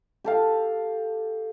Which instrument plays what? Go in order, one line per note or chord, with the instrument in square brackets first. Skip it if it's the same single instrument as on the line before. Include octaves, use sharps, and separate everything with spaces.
[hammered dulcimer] G4 A4 F5